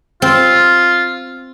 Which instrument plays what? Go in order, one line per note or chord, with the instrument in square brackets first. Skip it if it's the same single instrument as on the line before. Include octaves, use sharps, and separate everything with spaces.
[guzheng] C4 [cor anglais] F4